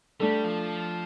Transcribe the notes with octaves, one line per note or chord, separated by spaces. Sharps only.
G3 A3 D4 A4
F3